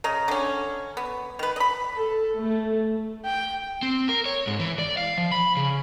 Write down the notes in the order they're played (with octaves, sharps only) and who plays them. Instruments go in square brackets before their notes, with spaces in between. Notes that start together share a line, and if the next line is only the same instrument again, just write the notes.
[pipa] C#3 D#5 A#5
D3 C#4
B3
D#3 B4
D#5 B5
[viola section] A4
A3
[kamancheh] G5
[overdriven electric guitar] C4
A#4
C#5
G#2
E3
D5
F5
F3
B5
C#3